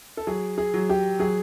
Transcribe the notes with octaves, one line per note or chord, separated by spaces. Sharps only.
A4
F#3 G#4
G#4
F#3
G4
F#3 G#4